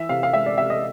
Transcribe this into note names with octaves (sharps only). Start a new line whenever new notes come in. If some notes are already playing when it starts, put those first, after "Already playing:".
Already playing: E3 E5
C3 F5
F5
G#3 E5
D5
C3 E5
D#5